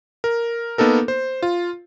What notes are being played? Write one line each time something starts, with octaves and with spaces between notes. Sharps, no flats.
A#4
A#3 B3 D#4 A4 A#4
C5
F4